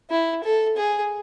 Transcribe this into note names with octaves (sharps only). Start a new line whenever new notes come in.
E4
A4
G#4